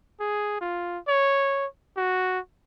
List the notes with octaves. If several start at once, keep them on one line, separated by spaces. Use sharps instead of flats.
G#4
F4
C#5
F#4